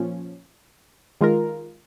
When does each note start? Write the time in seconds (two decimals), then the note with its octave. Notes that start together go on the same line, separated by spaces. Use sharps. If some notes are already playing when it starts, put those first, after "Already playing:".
Already playing: A#2 F3 C#4
1.21 D#3 G#3 F4 A#4